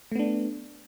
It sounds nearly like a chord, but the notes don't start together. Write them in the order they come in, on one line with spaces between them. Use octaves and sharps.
A3 B3 D4